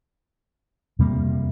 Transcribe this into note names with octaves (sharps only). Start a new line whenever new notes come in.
F2 C3 G3 A#3